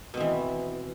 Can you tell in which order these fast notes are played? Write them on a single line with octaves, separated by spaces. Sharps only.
B2 C4 E3